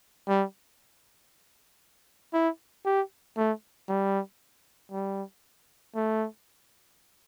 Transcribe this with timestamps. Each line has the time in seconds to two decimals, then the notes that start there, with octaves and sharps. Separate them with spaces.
0.28 G3
2.34 E4
2.86 G4
3.37 A3
3.89 G3
4.92 G3
5.96 A3